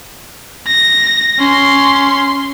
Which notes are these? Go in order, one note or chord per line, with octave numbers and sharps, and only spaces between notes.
A#6
C#4 C6